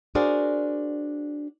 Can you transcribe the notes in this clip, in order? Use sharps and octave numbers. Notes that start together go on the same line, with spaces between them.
D4 F#4 G#4 A#4 C5 D5